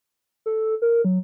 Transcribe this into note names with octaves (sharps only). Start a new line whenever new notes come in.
A4
A#4
F#3